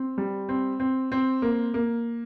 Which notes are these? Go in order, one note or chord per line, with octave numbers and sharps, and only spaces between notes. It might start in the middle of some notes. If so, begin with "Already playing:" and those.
Already playing: C4
G3
C4
C4
C4
A#3
A#3